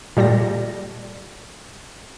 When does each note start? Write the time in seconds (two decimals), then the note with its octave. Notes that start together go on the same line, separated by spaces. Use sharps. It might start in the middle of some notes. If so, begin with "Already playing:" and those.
0.17 A#2 G3 A4 A#6